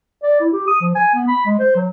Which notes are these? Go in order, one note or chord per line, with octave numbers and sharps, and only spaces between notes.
D5
E4
G4
D#6
F3
G#5
B3
B5
G#3
C5
F#3